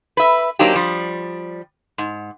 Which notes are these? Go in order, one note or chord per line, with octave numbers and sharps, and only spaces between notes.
B4 E5
F#3 A#3 C4 D4 D#4 G4
F3 G3
G#2